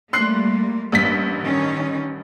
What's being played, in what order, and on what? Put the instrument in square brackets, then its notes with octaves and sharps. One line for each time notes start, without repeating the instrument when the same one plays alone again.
[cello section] G3 A3 A#3 [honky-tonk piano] C6 F#6 C7
[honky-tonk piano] A1 G2 B6 [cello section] A#3
[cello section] D#3 C#4